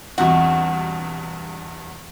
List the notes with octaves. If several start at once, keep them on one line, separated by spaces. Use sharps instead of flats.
E2 G2 B2 E3 C4 F4 F#4